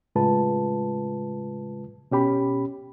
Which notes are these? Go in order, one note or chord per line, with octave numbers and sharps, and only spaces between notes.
A2 C#3 G#3 F4 B4 A5
B2 C#4 G4 B5